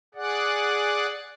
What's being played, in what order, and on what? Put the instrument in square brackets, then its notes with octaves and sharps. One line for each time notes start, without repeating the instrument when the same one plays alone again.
[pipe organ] G#4 D5 F#5